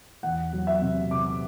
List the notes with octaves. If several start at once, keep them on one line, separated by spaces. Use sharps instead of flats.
E2 F#5
F#3
E5
C3
C3 D6